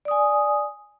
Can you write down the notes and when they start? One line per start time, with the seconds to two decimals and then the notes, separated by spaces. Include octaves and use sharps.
0.05 D5
0.08 D#6
0.11 G#5